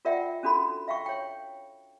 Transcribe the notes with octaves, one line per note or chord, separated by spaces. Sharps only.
F4 A#4 D5 E5 F#5 G5
C#4 D4 F#4 A4 B5
E5 F5 G5 C#6
C#5 G5